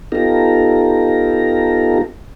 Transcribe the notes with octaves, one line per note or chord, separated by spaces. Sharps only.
B3 D#4 F4 G4 A4 A#5